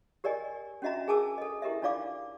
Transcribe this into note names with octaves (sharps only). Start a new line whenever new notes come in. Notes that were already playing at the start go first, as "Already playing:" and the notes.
G4 A#4 D5 D#5 G#5
C#4 D4 F#4 D#5 E5 A#5
G#4 A#4 G#5 A5 D6 E6
A4 D#5
E4 G4 A#4 D#5 E5
D4 D#4 F4 D5 F5 D6